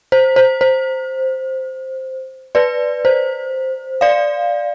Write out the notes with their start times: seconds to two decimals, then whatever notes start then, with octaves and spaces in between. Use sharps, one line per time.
0.12 C5
0.36 C5
0.61 C5
2.55 B4 D5
3.05 C5
4.01 D5 F5